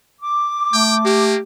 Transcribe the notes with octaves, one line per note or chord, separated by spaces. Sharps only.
D6
A3 G5
A#3 G4